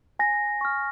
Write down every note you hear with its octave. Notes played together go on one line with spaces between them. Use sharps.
G#5 A#6
C#6 F6